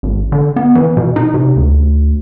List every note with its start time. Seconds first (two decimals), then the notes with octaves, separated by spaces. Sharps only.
0.03 G#1
0.32 D3
0.56 B3
0.75 E3
0.97 B2
1.16 D#4
1.34 C3
1.56 D2